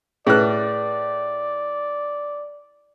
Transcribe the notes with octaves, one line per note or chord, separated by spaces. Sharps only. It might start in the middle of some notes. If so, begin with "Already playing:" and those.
A2 G#4 B4 D5 F#6